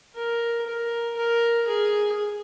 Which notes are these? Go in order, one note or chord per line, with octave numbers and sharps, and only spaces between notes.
A#4
A#4
A#4
G#4